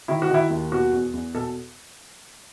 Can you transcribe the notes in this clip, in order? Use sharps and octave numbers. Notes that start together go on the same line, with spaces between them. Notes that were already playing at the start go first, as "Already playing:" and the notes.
D#3 E4
F#4
D#3 E4
D#2
B2 F#4
E2
E2
B2 A4